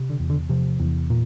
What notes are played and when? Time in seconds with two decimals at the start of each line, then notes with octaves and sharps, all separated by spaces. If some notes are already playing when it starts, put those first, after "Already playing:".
Already playing: C3
0.10 D3
0.20 E2
0.30 D3
0.49 C3 F3
0.80 E2
1.10 A#2